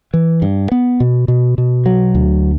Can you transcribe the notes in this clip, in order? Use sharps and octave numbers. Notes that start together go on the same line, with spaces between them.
E3
G2
B3
B2
B2
B2
F#3
D2